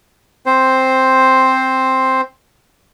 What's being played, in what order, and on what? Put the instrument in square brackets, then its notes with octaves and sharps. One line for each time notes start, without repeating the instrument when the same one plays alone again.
[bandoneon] C4 C5